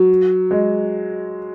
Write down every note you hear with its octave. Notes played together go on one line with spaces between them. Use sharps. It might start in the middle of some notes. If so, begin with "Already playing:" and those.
Already playing: F#3
G#3